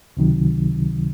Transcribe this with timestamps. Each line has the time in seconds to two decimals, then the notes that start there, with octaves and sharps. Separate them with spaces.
0.17 C#2 C3 D#3 F#3